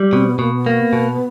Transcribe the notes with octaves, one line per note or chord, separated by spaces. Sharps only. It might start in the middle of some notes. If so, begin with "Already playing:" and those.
Already playing: G3
B2 C4
B3
B2 A#3
B3
A#3
B2